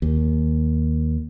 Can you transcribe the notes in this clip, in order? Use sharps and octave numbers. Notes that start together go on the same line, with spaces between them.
D#2